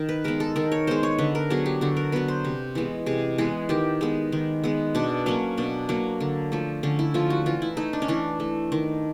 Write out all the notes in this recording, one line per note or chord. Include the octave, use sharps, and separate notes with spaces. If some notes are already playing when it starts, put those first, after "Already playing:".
Already playing: D#3
B4
G#3 B3 A#4
A4
D#3 A#4
C#5
G#3 B3 C5
C#5
D3 B4
A#4
F#3 B3 G#4
G4
D3 F#4
A#4
F#3 B3 B4
C5
C3
E3 G#3 B3
C3 G#4
E3 G#3 B3 G#4
D#3 G4
G#3 B3
D#3
G#3 B3
B2 D4
F#3 A#3 C#4
B2 D4
F#3 A#3
D3
F3 A3
D3 C#4
E4
F3 A3 F4
F#4
E3 F4
E4
A3 D#4
D4
C#4
E3 D4
A3
D#3